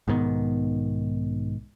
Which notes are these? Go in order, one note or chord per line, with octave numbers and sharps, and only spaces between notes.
B1 G#2 D#3 B3